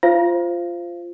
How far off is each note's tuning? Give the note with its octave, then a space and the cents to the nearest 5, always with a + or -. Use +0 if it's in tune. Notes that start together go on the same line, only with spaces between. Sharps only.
F4 -10 C5 +0 F5 -25